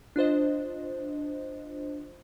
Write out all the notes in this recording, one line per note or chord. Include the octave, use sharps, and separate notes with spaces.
D4 F4 C5 D#5